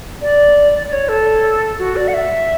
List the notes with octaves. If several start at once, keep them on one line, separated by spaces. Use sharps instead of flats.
D5
D5
D5
C#5
A4
F#4
D5
F#5
E5